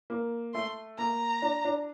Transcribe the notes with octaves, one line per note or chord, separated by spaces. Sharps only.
A#3
A3 C6
A#3 A#5
D4
D4